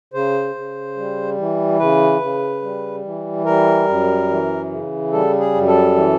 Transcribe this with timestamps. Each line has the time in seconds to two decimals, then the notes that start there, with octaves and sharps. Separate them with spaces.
0.14 C#3 C5
0.55 C#3
0.97 G3
1.38 E3
1.79 C#3 B4
2.21 C#3
2.62 G3
3.05 E3
3.45 G3 A#4
3.88 F#2
4.29 E3
4.71 C#3
5.12 G3 A4
5.40 G#4
5.54 F#2
5.68 A4
5.96 E3